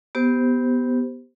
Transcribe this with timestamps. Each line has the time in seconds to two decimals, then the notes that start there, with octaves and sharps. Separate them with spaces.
0.15 B3 G4 C5